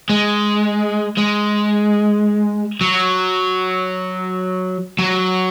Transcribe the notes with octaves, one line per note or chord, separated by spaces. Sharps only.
G#3
G#3
F#3
F#3